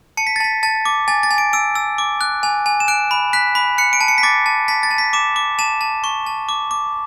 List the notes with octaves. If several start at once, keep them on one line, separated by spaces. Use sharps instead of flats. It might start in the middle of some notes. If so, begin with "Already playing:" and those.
A5 C#7
B6
A6
A5 B6
A5 A6
D6
G#5 A6
A6
G#5
D7
E6 D7
E6
D6
F#6
G#5
G#5
E7
F#6 D7
B5
F#6 B6
B5
F#6 C#7
D7
A5
C#7
B6
D6 A6
A5
A5 B6
A6
A5
B6
D6 E7
D6
A5 E7
A5
C#6
A5
D6
D6